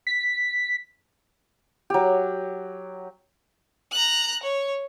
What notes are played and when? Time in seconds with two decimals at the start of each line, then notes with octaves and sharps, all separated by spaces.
0.07 B6
1.90 F#3 G4
3.92 A#5 F#6
4.43 C#5